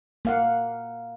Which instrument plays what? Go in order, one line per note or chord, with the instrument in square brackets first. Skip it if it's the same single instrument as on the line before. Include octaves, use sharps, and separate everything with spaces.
[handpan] A#3 F5 F#5